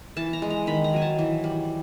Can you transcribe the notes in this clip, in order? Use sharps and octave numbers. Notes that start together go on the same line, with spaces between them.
E3 A5
A#5
G#3
A#5
D#3 B5
A#5
F#3 G#5
A5
E3
G3